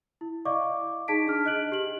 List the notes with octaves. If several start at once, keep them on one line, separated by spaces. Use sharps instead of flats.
E4
D5 D#5 F5 C#6 D6
D#4 G#4 A5 B6 D7
D4 G#4 F6
D#5 F#6 D7 F#7
G4 F#7